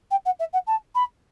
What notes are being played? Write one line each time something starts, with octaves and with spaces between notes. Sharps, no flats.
G5
F#5
E5
F#5
A5
B5